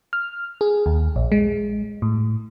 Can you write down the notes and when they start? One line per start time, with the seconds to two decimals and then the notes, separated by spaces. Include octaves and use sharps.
0.13 F6
0.61 G#4
0.86 D#2
1.16 A#1
1.32 G#3
2.02 A2